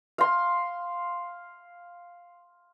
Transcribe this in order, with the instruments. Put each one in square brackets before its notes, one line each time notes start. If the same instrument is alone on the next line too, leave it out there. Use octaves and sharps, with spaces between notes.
[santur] F5 C6